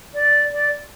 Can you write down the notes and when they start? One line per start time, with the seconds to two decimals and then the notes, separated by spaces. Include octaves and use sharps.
0.14 D5
0.52 D5